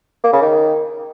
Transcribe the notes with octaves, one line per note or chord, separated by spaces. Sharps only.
A#3
C#3
D#3